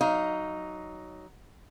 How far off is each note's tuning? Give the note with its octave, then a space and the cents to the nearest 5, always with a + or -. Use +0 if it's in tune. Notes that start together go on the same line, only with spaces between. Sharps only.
F#3 +15 D#4 +0 F5 -15